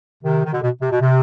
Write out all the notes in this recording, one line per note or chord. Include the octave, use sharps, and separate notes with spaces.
C3 D#3
D#3
B2 D3
B2
C3
B2
C3